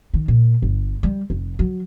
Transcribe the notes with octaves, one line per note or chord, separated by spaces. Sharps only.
D#3
A#2
G1
G3
F1
F#3